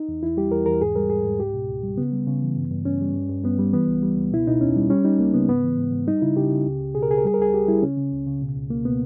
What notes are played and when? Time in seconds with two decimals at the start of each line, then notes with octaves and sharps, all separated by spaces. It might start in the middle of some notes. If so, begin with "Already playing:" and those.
Already playing: D#4
0.08 E2
0.23 E2 E4
0.37 G3 G4
0.51 E2 A#4
0.66 E2 A#4
0.81 G#2 G#4
0.96 G3 A#4
1.10 G#2 G#4
1.24 G#2
1.39 C#2 G4
1.54 B2
1.69 C#2
1.83 G3
1.97 C#3 B3
2.12 G3
2.27 C#3
2.42 E3
2.57 G2
2.71 G2
2.85 G2 C#4
3.01 G3
3.14 G2
3.29 G2
3.44 G2 B3
3.59 G3
3.73 E3 B3
3.88 C#2
4.02 G3
4.17 C#2
4.32 B2 E4
4.47 B2 D#4
4.61 E2 C#4
4.76 G3
4.90 G3 C#4
5.05 G3 D#4
5.19 C#2 A#3
5.34 C#3 B3
5.48 G#2 B3
5.64 E3
5.78 G#2
5.92 G#2
6.07 G3 D#4
6.22 C#3 E4
6.36 C#3 G4
6.51 C#3
6.66 C#2
6.80 C#2
6.95 B2 G#4
7.03 A#4
7.09 C#2 G#4
7.18 A#4
7.24 G3 G#4
7.34 A#4
7.39 C#2 G#4
7.54 C#2 G4
7.68 G3 E4
7.82 C#3 C#4
7.97 C#3
8.12 C#2
8.26 C#3
8.42 B2
8.56 C#2
8.70 C#2 A#3
8.85 B2 B3